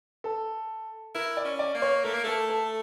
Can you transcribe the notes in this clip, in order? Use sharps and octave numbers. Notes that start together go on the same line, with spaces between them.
A4
E4 A#4
D5
C#4
D5
A#3
C#5
A3 A#4
A#3
A3 A4
A4